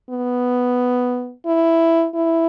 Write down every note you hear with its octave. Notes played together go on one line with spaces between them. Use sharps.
B3
E4
E4